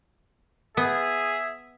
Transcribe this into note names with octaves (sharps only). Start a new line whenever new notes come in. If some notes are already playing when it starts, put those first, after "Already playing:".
B3 G#4 E5